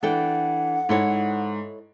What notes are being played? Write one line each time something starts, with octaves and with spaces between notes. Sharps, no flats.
E3 D4 A4 F#5 G5
G#2 E4 A4 C#5